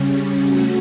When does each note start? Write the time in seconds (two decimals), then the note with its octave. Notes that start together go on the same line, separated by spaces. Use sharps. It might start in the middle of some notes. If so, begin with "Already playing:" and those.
Already playing: C#3 G3 C#4
0.47 A3 C#4 F#4